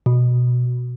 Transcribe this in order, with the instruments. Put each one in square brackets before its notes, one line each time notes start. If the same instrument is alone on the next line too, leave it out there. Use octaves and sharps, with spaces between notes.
[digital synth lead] B2